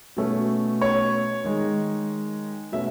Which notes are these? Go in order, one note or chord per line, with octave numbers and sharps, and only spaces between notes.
B2 A3 C#4
C#5
D#3 G#3 D#4
B2 A3 C#4 E5